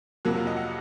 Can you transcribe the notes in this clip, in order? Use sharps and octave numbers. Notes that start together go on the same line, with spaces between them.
F2 C3 F#3 A#3 F#4
F4
D#5
F#5